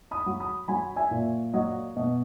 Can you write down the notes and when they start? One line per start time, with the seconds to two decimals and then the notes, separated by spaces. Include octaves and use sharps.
0.11 B5 D#6
0.26 F#3
0.40 B5 D#6
0.68 F#3 G#5 B5
0.96 E5 G#5
1.11 A#2
1.53 F#3 D#5
1.97 B2 D#5